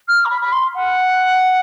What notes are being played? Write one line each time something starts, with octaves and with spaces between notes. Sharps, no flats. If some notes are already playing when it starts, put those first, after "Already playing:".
F6
A#5
B5
B5
C6
F#5